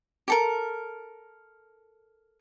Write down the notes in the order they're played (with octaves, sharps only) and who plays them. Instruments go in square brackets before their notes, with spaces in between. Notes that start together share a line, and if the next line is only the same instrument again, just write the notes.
[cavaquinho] G4 A4 A#4